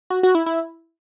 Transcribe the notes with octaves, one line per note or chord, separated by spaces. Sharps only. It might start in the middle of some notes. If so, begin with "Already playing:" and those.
F#4
F#4
E4
E4